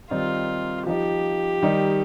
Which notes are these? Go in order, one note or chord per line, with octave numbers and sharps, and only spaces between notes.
D#3 G3 C4 D#4 F4
F3 D#4 G4
D#3 G3 D#4